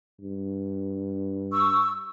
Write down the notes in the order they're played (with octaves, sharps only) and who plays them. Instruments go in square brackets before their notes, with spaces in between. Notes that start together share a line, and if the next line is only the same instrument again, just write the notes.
[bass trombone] G2
[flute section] C#6 E6